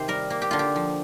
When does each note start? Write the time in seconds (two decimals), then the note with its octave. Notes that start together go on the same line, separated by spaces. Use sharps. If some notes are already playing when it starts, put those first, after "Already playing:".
Already playing: C3 D#3 G4 C5
0.08 G3 A#4
0.30 A#3
0.42 G4
0.51 D3 F4
0.59 G4
0.76 F3